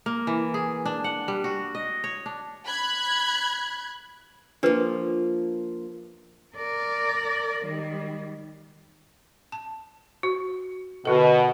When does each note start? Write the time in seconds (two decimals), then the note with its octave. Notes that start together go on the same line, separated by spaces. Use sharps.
0.06 A#3
0.27 E3
0.54 G#4
0.85 D4
1.04 F#5
1.28 G3
1.44 F#4
1.75 D#5
2.04 C#5
2.26 D4
2.67 B5 F#6 G#6
4.63 F3 A#3 D4 B4
6.56 A#4 D5
7.65 D#3 G3
9.52 A5
10.23 F#4
11.05 B2 D3 F#4 A4